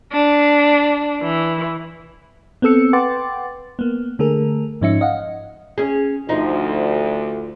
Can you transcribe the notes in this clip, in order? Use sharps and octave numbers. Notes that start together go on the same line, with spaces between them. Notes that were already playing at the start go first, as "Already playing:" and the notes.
D4
E3
B3 C4 A4 E6 C#7
B4 F#5 G5 C6 D6 A6
A#3 B3
D3 A3 G#4 A#4
G#2 F3 C#4 D#4 E5 C#7
D#5 F5 F#5
C#4 G#4
D2 F3 D#4